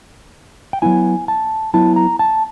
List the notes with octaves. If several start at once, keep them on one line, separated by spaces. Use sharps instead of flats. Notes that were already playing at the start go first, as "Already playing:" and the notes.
G5
F#3 B3 E4 G#5
A5
F#3 B3 E4 A5
A#5
A5